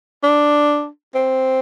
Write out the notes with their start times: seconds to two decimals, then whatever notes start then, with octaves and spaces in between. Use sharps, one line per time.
0.23 D4
1.15 C4